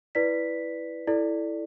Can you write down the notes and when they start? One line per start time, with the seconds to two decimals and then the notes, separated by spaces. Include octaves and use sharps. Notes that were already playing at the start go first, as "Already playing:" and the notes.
0.15 E4 B4 D5 B6
1.07 E4 A4 D5